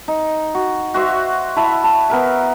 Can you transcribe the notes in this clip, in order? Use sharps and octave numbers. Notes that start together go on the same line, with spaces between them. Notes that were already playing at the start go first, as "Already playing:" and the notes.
D#4
F#4
F#4 C5 E5 F5
E4 E5 A5 B5
A5
B3 A#4 E5